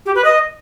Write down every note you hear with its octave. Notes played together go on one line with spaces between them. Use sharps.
G4
B4
D#5